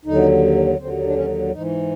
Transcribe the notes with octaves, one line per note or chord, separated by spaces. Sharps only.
D#2 D3 F#3 D#4
D#2 D3 F#3 C4
D4
C#4
G#2 E3 D#4